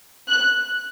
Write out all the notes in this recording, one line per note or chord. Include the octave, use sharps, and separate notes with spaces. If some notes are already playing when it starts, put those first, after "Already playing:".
F#6